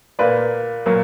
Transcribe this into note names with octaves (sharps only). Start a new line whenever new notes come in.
A#2 A#3 B4 D5
A#2 F#3 A#3